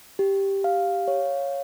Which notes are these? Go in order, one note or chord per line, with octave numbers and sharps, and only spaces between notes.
G4
F5
C#5